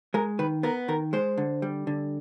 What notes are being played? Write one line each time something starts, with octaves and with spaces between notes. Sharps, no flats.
G#3 A#4
D#3 B4
B3 A#4
D#3 A#4
G#3 C5
D3
G3
D3